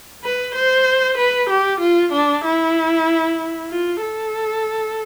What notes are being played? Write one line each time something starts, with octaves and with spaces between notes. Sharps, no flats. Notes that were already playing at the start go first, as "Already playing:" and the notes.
B4
C5
B4
G4
F4
D4
E4
F4
A4